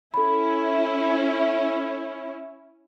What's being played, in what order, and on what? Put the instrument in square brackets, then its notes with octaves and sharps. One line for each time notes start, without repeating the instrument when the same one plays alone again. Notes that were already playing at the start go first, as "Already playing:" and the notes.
[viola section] C#4 E4 [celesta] A4 B5